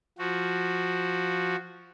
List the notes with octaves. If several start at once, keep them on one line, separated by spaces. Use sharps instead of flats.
F3 F#4